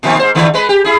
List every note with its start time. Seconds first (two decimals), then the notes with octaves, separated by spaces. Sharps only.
0.03 A#2 D#3 F3
0.19 G#2 C5
0.35 D3 D#3 A3
0.54 G#3 B4
0.69 G4
0.85 E4 G#4